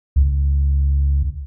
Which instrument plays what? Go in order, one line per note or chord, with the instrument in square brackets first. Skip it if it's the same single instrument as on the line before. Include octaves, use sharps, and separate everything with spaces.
[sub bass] C#2